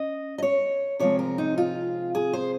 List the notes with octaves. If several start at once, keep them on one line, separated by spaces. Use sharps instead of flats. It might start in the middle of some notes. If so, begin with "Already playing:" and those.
Already playing: C#4 D#5
D#5
C#5
C3 F3 G#3 C4 C#5
A#4
D#4
F4
G#4
C5